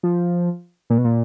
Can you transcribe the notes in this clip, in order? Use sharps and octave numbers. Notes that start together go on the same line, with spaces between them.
F3
A#2
B2
A#2